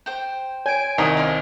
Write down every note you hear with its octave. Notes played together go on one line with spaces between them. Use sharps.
C5 G5
C#5 G#5 D7
C2 D#3 C5 D#5 F#5 A#5 D#6
D4 F5 C6